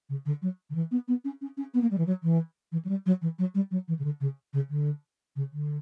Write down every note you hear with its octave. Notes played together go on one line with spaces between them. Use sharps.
C#3
D3
F#3
D3
E3
B3
B3
C#4
C#4
C#4
B3
A#3
G3
E3
F#3
E3
E3
F#3
G3
F#3
E3
F#3
G3
F#3
E3
C#3
D3
C#3
C#3
D3
C#3
D3